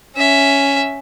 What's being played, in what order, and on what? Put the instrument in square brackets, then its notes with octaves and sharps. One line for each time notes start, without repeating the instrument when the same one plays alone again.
[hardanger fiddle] C#4 E5